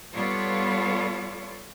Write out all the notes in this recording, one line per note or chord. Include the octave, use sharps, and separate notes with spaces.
G3 B3 F4 A4 C#5 D5